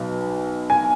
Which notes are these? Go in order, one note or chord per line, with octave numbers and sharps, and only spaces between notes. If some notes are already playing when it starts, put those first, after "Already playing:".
Already playing: B1 B2
G#5